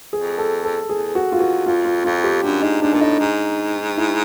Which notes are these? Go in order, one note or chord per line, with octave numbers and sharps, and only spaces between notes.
F2 G#4
A4
A4
E2 G#4
F#4
E2 F4
F#4
F2 F4
F4
F2 F4
G4
F#2 D4
G#2 D#4
G#2 D4
A#2 D4
A2 D#4
G#2
E4